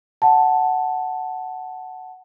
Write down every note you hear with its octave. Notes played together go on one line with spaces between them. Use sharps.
F#5 A5